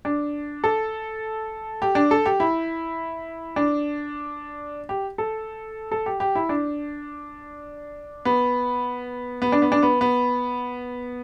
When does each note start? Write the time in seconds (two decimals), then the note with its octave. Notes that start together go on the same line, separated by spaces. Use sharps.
0.05 D4
0.64 A4
1.82 G4
1.95 D4
2.11 A4
2.26 G4
2.40 E4
3.56 D4
4.89 G4
5.18 A4
5.92 A4
6.06 G4
6.20 G4
6.35 E4
6.49 D4
8.25 B3
9.42 B3
9.52 D4
9.62 B3
9.72 D4
9.83 B3
10.01 B3